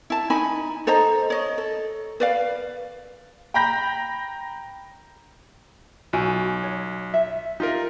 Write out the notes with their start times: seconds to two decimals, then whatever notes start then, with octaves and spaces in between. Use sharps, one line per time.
0.10 E4 A5
0.30 D#4 G#5 B5
0.87 A4 C5 D#5 A#5
1.30 C#5 D#5
1.58 A4
2.20 B4 D5 F5
3.54 G5 A#5 B5 G6 A#6
6.13 B1 F#4 G5 G#5
6.63 C#5
7.14 E5
7.60 D#4 F4 G4 A#4